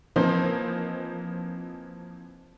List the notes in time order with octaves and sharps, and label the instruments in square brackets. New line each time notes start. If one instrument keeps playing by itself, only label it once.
[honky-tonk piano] E3 F3 A#3 C4 D#4 C5